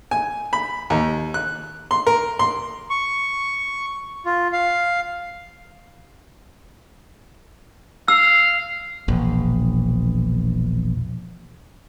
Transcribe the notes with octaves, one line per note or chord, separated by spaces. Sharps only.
G#5
B5
D#2
F#6
C6
A#4
C6
C#6
F4
F5
F5 E6
E1 A#1